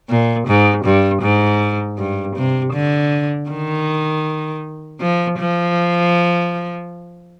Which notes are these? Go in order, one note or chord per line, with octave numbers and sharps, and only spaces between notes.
A#2
G#2
G2
G#2
G2
C3
D3
D#3
F3
F3